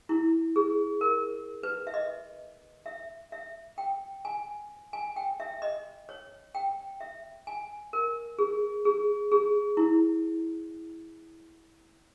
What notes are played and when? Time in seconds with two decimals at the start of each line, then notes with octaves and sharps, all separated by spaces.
0.09 E4
0.56 G#4
1.01 A#4
1.63 B4
1.87 E5
1.94 D#5
2.86 E5
3.32 E5
3.78 G5
4.25 G#5
4.93 G#5
5.16 G5
5.40 E5
5.62 D#5
6.09 C#5
6.55 G5
7.00 E5
7.47 G#5
7.93 A#4
8.38 G#4
8.85 G#4
9.31 G#4
9.77 E4